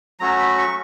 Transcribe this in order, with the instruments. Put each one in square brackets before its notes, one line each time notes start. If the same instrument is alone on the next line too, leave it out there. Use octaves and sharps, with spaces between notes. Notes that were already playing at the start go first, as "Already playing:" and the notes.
[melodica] F#3 A3 C#4 F#4 A#5
B5
C#6